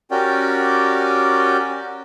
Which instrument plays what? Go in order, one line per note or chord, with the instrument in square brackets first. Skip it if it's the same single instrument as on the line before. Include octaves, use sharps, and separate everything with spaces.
[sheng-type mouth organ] C#4 F#4 G4 A#4 D5 G5